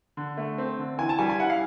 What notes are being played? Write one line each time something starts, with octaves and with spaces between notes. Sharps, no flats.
D3
A3
C4
D3
E3 G#5
A5
G3 G#5
G#5
E4 F#5
F5